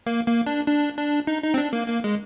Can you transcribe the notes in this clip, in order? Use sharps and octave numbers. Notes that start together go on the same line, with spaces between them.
A#3
A#3
D4
D4
D4
D#4
D#4
C4
D4
A#3
A#3
G#3